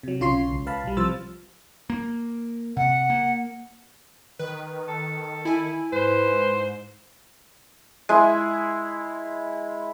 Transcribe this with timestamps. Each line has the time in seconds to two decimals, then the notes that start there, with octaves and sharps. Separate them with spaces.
0.03 C3 F#3
0.20 B1 C#3 F4 C#5 C6 C7
0.51 C#2
0.66 B4 F5 A5 B5
0.84 B1 G3
0.97 C3 F3 C5 E6 F6 A6
1.90 A#3
2.77 C3 F#5
3.10 A#3
4.39 D#3 B4
4.88 A4
5.45 E4 G#5
5.92 G#2 B4 C5
8.09 G#3 E4